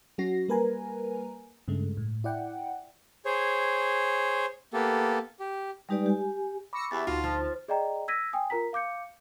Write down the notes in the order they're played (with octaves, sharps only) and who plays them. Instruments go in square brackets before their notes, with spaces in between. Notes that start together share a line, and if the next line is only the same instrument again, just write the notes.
[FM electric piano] F#3 C#4 F#4 A#6 C7
G3 A#3 A#4 B4 G#5 A#5
G2 C#3 G#3 A3
A2
E4 D5 F#5 G5
[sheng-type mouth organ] G#4 C5 C#5
A#3 B3 G4 A4
G4
[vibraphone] G3 G#3 D#4 G4 B4 D5
G4 G#5
[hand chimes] B5 C#6 D6 [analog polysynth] E6 A#6 C#7
[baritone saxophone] E2 [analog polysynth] G4 E5 [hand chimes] A6
[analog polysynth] D2 A5 [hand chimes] D#4 C6 [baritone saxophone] F4 [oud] F#4
[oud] F3 [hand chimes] F6 A6
[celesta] G#4 D5 D#5 G5 A#5
E6 G#6 A#6 B6 D#7
G5 G#5 D#6
F4 A#4 A#5 B6
F5 D6 G6 C#7